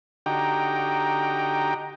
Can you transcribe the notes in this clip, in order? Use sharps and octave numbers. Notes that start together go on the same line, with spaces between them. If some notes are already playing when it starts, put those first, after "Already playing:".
D3 D#4 F#4 G4 G5 A#5